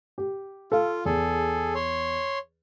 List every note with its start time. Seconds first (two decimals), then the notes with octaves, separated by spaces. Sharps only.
0.18 G4
0.72 F4 A4 F5
1.05 E2 G#4 A4
1.75 C#5 C6